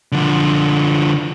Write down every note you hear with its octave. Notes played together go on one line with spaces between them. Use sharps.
D3 F3